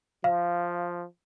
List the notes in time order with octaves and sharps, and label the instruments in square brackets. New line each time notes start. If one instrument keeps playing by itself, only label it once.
[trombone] F3 [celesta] F5